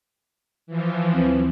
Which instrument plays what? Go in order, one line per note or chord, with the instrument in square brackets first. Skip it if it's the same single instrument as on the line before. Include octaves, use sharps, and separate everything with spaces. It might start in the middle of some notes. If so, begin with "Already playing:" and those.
[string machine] E3 F3
[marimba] D2 F#3 C4